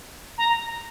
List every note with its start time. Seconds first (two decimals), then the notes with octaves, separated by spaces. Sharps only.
0.38 A#5